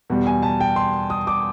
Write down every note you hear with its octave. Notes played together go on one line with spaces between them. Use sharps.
E2 B2 G3
G#5
A5
G5
C6
D#6
D6